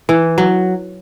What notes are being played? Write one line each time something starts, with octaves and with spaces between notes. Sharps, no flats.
E3
F#3